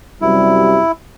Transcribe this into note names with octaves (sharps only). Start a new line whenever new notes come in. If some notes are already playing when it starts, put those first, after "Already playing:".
F#2 C3 G3 E4